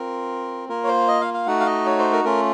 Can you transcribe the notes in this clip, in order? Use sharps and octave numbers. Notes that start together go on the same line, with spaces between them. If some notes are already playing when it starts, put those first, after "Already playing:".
Already playing: C4 F4 A#4
A#3 F4 A#4
C#5
C5
D#5
F5
F5
A3 D#4 F#4 F#5
F5
D#5
C#5
C5
A#4
A3 C#4 F4 A#4